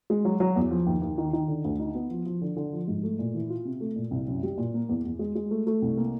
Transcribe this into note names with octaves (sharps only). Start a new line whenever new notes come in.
G#3
F#3
F#3
E2
F3
D#2
D#2
D#3
D#3
D3
D2
D#4
B3
F3
F3
D3
D3
F3
G#2
A3
A#2
E3
F4
C3
A3
A#2
C2
F#2
G3
A#2
A#3
E2
E2
G#3
G#3
A3
A3
C2
A#3